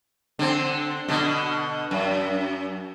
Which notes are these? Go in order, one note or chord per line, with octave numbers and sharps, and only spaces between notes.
D3 C4
B2 D3
F#2